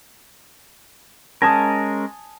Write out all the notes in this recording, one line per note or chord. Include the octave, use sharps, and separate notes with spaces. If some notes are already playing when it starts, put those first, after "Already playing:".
G#3 C#4 A#4 G#5 A5 D#6